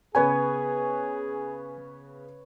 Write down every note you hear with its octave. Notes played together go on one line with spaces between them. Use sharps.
C#3 B3 G#4 B4 C#5 G#5